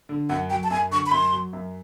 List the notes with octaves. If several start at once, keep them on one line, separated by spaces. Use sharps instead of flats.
D3
F#2 F#5
F#3 G5
A5
F#2 G#5
D3 C#6
B5
F#2 C6
F#3
F#2